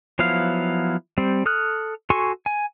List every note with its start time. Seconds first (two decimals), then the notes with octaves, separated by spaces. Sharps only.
0.19 F3 F#3 B3 E4 F5
1.18 G3 C4
1.46 A4 D#6 F6 F#6
2.10 F#4 A4 G#5 C6 C#6
2.46 G#5